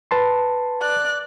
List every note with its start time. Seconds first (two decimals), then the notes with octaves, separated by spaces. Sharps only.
0.11 B4 A5 C6
0.81 D5 F#6